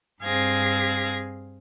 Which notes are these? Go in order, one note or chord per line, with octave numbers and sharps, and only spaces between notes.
G2 C4 G#4 F5 G#6 A#6